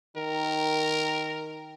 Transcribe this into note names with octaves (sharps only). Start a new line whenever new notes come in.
D#3 A#4